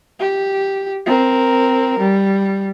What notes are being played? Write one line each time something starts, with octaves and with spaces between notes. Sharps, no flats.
G4
C4 A#4
G3